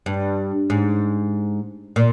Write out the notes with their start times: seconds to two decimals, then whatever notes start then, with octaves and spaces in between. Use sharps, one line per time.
0.06 G2
0.70 G#2
1.96 A#2